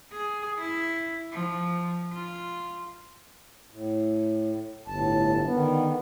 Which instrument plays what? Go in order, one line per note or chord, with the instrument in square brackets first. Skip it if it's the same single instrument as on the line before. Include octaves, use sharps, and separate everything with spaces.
[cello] G#4
E4
F3
F4
[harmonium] A2
[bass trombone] G1 [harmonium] A2 A5
[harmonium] D3 D#3 [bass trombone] B3